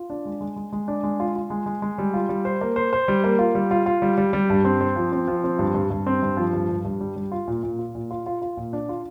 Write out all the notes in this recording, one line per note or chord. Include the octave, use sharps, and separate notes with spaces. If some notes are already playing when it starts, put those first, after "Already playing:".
Already playing: F4
D4
G#3
G#3
G#3
G#3
D4
G#3
F4
F4
G#3
G#3
G#3
G3
F4
G3
C5
A#3
C5
C5
G3
A#3
F4
G3
F4
F4
G3
G3
G3
G2
C4
C4
F3
C4
F3
C4
G2
G2
G2
C4
G2
F3
G2
G2
G2
G3
G3
F4
A#2
A#2
F4
A#2
F4
F4
F4
A#2
D4
F4